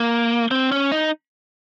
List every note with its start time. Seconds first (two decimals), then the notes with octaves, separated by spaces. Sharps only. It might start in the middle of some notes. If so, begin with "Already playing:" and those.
Already playing: A#3
0.51 C4
0.72 C#4
0.92 D#4